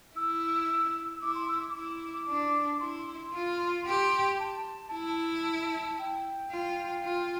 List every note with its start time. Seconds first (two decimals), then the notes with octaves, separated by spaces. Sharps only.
0.16 E4 E6
1.22 E4 D6
1.35 C6
1.48 E6
1.62 D6
1.74 E4 D6
2.28 D4
2.80 E4 C6
3.33 F4
3.86 G4 C6
4.39 A5
4.93 E4 A5
5.99 G5
6.51 F4
7.03 F4